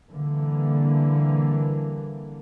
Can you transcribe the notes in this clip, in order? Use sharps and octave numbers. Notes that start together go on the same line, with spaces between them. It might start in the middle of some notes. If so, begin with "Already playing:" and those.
D3 E3 G3 A#3